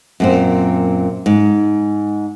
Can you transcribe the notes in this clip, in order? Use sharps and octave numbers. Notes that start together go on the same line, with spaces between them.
F#2 A#2 C4
G#2